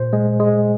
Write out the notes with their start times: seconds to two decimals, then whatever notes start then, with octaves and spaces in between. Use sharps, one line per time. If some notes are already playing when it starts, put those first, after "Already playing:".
Already playing: A#2 C5
0.13 G#3
0.40 G#3